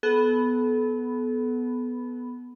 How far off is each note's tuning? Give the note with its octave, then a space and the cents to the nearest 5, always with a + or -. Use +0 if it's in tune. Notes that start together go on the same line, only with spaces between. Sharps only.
B3 +0 A4 -35